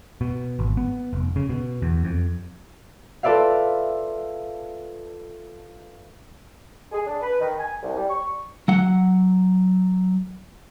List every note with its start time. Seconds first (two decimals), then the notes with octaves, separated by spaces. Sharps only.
0.21 B2
0.59 G#1
0.77 B3
1.13 F1
1.36 C#3
1.49 B2
1.82 E2
2.05 F2
3.23 F4 A4 B4 D5 E5 F5
6.92 G#4
7.05 D4
7.21 B4
7.40 D#3
7.59 G#5
7.81 C2
7.96 G3
8.09 C#6
8.68 F#3 F#5